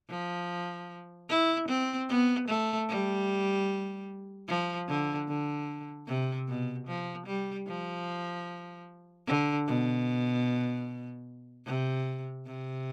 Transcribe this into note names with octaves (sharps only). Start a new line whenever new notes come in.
F3
E4
C4
B3
A3
G3
F3
D3
D3
C3
B2
F3
G3
F3
D3
B2
C3
C3